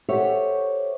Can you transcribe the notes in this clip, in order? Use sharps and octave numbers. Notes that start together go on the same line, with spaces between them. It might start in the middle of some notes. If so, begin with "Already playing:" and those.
G4 A4 C5 C#5 E5 F#5